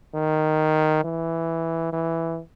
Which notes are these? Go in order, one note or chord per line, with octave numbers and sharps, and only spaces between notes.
D#3
E3
E3